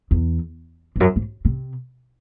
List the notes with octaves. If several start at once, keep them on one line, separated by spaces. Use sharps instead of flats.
E2
E2
F#2
G#2
C3